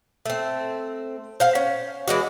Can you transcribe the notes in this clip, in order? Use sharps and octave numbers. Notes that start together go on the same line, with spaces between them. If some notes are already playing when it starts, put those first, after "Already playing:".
A3 C4
C5 F5 F#5
C#4
E3 G#3 F#4